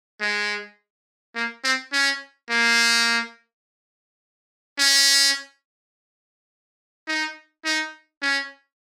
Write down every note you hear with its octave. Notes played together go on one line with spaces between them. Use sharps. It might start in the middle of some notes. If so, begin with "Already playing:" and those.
G#3
A#3
C4
C#4
A#3
C#4
D#4
D#4
C#4